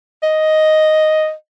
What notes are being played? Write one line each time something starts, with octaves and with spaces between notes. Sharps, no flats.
D#5